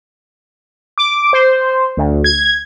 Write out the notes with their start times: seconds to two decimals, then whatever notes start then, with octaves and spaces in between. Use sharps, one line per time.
0.98 D6
1.33 C5
1.97 D2
2.24 G#6